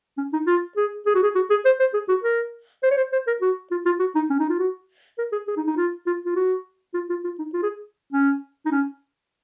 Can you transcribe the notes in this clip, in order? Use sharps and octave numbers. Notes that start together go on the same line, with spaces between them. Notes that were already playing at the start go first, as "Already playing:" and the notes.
C#4
D#4
F4
G#4
G#4
F#4
G#4
F#4
G#4
C5
C5
G#4
F#4
A#4
C5
C#5
C5
C5
A#4
F#4
F4
F4
F#4
D#4
C#4
D#4
F4
F#4
A#4
G#4
G#4
D#4
D#4
F4
F4
F4
F#4
F4
F4
F4
D#4
F4
G#4
C#4
D#4
C#4